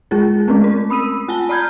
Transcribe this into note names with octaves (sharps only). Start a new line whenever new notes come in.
G#3 F4 G#4
G#3 A3 C4 C#4
A#4
B5 D#6 E6 D#7
F4 G#5 A5 G7
D5 A#5 B5 F6 G6 G#6